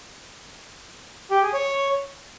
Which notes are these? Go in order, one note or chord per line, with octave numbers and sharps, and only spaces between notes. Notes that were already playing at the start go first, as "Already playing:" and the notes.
G4
G#4
C#5